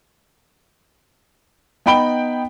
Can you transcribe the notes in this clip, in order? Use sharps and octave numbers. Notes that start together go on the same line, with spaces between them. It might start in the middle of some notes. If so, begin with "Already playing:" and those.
B3 D#4 G5 B5 D7 G7